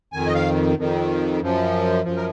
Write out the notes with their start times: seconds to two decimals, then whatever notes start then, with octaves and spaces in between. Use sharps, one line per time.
0.13 F2 D#3 G#5
0.27 D#5
0.35 F5
0.77 F2 D#3
1.41 F#2 F3
2.04 F#2 F3
2.17 A#4